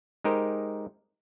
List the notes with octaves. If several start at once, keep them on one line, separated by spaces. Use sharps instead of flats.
G#3 D#4 G4 A#4 C5